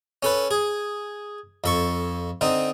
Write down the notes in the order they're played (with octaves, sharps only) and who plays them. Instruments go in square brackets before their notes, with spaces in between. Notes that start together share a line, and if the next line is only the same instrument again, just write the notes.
[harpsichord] C#4 A4 B4
G#4
F2 A4 C#6
D3 C4 D#4